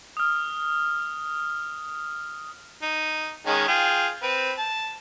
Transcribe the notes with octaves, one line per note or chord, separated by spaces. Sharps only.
D#6 F6
D#4
D#3 G#3 C#4
F4 G#4 G5
C4 B4
A5